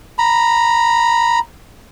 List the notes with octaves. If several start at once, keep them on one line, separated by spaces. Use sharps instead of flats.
A#5 B5